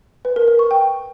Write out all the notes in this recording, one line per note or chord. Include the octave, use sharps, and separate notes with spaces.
B4
A#4
A#4
C#6
G5